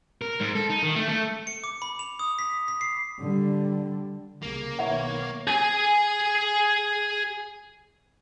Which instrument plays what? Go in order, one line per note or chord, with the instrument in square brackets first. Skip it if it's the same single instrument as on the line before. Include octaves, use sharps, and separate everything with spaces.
[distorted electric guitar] A#4
G#2
A4
D#4
D#3
A3
A3
[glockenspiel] C#7
D6
B5
F7
D#6
B6
B6
C7
[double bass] D3 G3
[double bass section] C2 C#3 [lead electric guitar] A#3
[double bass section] B1 D#3 B3 [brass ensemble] C#5 [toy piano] E5 F#5
[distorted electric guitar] G#4 G#5